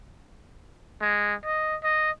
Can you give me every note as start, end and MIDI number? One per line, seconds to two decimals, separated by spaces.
1.01 1.34 56
1.45 1.76 75
1.84 2.10 75